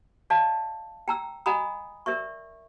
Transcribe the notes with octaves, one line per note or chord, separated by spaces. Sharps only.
D5 D#5 F5 A5
G5 A#5 E6
D#5 F#5 G#5 A#5 B5 D#6
A#4 D5 E5 C#6